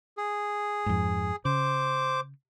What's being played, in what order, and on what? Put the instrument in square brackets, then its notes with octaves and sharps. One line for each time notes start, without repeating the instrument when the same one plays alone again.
[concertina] G#4
[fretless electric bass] F2 G#2
[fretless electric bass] C#3 [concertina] C5 D6